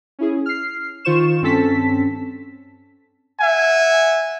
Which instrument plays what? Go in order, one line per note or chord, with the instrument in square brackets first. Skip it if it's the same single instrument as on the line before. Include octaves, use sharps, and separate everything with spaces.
[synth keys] C#4 E4 G#4
F6 C7
D#3 F4 C5 C#6 E7
G2 C4 C#4 A4 A5 B6
[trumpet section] E5 F#5 G#5